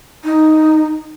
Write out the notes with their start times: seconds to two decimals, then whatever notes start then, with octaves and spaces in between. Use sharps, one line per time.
0.24 D#4